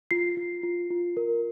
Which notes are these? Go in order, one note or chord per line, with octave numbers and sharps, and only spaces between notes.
F4 C7
F4
F4
F4
A#4